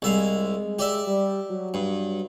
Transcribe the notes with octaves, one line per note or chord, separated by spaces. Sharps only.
C2 G#3 E5 F5
G4 D5 E5
G3
F#3
G2